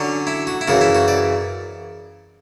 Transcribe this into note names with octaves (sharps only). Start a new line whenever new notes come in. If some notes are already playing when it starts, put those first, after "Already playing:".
Already playing: D3 F#3 C#4
E4
F#4
E4
F#2 C#3 E3 F#4
E4
F#4
D5